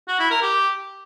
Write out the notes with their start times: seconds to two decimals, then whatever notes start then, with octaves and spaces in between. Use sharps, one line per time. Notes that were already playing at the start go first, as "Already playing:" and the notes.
0.08 F#4
0.19 E4
0.31 A#4
0.42 G4